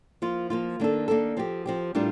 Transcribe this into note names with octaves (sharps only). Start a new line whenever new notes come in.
F3 A#3 F4
F3 A#3 F4
D#3 A#3 D4 A4
D#3 A#3 D4 A4
F3 C4 G4
F3 C4 G4
A2 G3 D4 F4 A#4